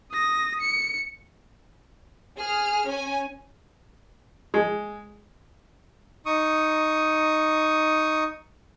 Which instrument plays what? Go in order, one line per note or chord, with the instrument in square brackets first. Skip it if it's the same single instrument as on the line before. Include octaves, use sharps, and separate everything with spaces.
[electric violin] D#6 A#6
C#7
[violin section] G#4 F6
C#4 G#5
[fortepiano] G#3
[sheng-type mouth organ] D#4 C#6 D#6